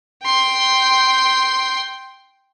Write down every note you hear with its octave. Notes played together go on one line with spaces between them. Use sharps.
G5 C6